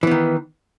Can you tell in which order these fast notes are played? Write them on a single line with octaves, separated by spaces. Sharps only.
E3 B3 D#3